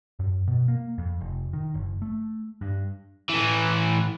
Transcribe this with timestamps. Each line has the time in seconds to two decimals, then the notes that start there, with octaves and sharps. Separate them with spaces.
0.19 F#2
0.47 B2
0.68 A#3
0.98 F2
1.21 F1
1.53 D#3
1.74 F#1
2.02 A3
2.61 G2
3.29 A2 E3